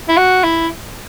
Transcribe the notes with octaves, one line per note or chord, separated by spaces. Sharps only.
E4
F#4
E4